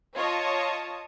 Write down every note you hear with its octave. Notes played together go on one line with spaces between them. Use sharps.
F4 C#5 D#5 A5 C#6 D#6